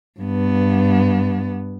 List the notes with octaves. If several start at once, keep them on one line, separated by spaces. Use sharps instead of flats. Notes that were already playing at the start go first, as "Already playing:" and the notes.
G2 B3